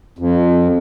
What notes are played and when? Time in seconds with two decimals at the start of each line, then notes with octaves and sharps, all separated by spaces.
0.19 F2